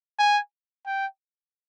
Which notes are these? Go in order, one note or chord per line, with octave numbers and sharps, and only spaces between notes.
G#5
G5